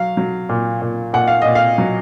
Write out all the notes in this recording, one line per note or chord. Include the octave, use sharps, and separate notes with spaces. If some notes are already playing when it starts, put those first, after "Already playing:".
Already playing: F#3 F5
F#3
A#2
A#2
A#2 F#5
F5
A#2 D#5
F5
F#3